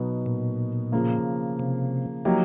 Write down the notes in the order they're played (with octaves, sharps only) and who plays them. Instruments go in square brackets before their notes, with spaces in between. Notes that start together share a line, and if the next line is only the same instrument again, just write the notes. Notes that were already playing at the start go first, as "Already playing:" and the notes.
Already playing: [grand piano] B2 F#3 B3 D#4
[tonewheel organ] A#2
[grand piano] C#3 F3 A#3
[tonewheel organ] C3
[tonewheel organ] F3 [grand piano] F#3 A#3 D#4 G4